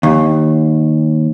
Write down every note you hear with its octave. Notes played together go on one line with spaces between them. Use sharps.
D#2